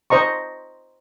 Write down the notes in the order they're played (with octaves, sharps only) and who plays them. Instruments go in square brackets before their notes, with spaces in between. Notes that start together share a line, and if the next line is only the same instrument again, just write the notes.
[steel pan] C5 D#5 A#5 C#6